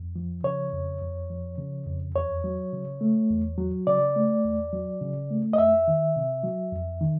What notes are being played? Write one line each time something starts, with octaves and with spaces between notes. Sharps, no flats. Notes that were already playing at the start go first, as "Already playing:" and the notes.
Already playing: F2
F3
C#3 C#5
F2
F2
F3
C#3
F2
E2 C#5
F#3
C#3
A3
E2
F#3
C#3 D5
A3
E2
F#3
C#3
A3
D#5
F2 E5
D#3
C3
F#3
F2
D#3